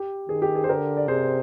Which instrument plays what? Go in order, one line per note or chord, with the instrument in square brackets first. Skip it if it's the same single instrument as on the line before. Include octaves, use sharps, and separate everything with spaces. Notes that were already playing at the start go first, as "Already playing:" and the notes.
Already playing: [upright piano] G4
[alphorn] D#3 [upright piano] G#4
[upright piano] G4
G#4
C5
[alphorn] D3 [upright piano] G4 A#4
[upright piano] D5
[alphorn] C3 [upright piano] G#4 C5